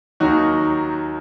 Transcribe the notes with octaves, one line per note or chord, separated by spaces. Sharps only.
D#2 D#3 F#3 D#4 F#4